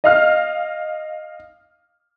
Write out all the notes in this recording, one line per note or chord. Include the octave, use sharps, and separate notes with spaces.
D#5 F5 F6